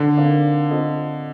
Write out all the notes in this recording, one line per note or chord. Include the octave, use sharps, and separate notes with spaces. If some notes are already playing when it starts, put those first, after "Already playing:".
Already playing: D3
C4 D#4 A#4 D5 F5
C4 F4 A4 D#5